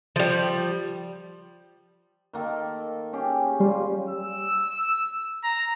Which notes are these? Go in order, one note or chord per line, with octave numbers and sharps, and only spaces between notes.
F3 G3
D#3 A#3 A4
C#4 G4 G#4
G3 F4
E6
A#5